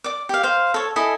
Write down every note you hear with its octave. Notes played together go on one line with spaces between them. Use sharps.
D5 D6
G4 F5
C5 F5
A4 C#5
E4 A4 D#5 G#5